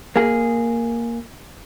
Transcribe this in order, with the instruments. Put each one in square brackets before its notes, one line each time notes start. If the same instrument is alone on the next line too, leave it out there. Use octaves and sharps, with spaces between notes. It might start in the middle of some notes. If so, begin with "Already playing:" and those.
[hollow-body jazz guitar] A#3 G#4